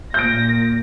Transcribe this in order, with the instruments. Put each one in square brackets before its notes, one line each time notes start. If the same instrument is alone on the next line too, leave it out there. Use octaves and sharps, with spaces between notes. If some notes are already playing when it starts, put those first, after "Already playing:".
[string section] A#2 A#6 [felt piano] G6 D7